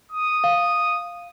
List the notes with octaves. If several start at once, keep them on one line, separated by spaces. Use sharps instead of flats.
D#6
F5